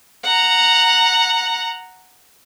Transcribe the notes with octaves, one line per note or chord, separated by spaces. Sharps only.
F#5 A#5